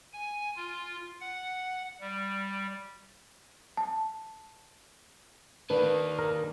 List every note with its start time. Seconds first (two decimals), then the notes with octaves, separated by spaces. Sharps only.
0.13 G#5
0.56 F4
1.21 F#5
2.01 G3
3.77 A5
5.70 D#3 A#3 D4 B4
6.19 A#4